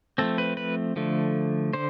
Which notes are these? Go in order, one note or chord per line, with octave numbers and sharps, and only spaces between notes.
F3 A3 C4 A4
B4
B4
D3 F3 A3
D3 C5